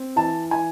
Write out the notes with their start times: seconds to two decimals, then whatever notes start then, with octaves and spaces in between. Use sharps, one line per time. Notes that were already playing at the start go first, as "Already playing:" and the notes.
Already playing: C4
0.16 E3 A5
0.51 E3 G#5